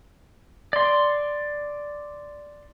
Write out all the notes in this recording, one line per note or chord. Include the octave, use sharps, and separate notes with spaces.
D5 C6